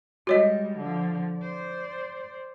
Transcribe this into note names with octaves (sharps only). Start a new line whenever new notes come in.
G3 G#3 F#4 C#5 D#5
D3 F3
C5 D5